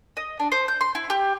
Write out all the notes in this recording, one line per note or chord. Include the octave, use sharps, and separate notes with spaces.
D#5
D4
C5
G6
C6
E4
G4